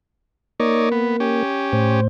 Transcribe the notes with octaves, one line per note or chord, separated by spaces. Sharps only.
A#3 D#4 C#5 D5
B3
C#4 G4
A2 C5